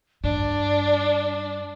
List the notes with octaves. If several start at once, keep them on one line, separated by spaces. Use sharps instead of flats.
G2 D4 D5